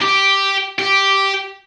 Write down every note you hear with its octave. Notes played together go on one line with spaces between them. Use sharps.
G4
G4